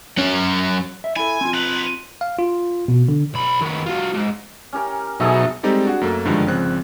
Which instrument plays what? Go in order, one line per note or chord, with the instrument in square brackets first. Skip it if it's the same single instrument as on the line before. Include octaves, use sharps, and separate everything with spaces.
[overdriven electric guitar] F#3 C#4
[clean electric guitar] E5
[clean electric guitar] E4 A4 [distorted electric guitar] G#5
[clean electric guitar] C4 F4
[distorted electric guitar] D#4 B4
[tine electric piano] F5
F4
B2
D3
[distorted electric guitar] B1 B5
D#3 B3
F#3 F4
G#2
[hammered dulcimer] C#4 G4 A#4
[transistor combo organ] B2 F#3 D#4 [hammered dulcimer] G#4 A4 E5
[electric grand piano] G3 G#3 C4 D#4 G4 A4
D4 F#4 G#4 F#5
F#2 A3 A#3 A4
G2 D3 D#3 F3 G3 G#3
G#1 C#3 F3 C4 F#6